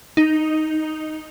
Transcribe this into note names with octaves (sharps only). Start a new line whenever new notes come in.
D#4